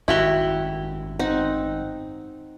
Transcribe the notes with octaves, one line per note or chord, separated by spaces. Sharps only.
G#1 F#2 D#3 E4 F#4 G4
C4 D#4 F#5